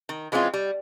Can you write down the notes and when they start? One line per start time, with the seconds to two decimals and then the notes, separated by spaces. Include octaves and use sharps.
0.09 D#3
0.32 E3 G#3 C4 C#4 F4
0.54 G3